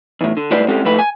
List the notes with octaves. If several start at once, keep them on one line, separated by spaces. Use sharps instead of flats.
E2 A2
D3
A2 G3 G#3 B4 C5 D5
G#3 C4 C#4 G4 A4
F2 G#2 A3 B4 B5
G#5